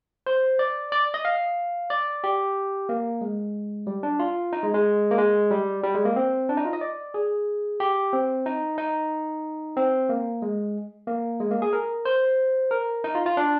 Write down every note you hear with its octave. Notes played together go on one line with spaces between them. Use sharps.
C5
D5
D5
D#5
F5
D5
G4
A#3
G#3
G3
D4
F4
D#4
G#3
G#3
A#3
G#3
G3
G3
G#3
A#3
C4
D4
D#4
F4
D#5
D5
G#4
G4
C4
D#4
D#4
C4
A#3
G#3
A#3
G#3
A#3
G#4
A#4
C5
A#4
D#4
F4
F4
D4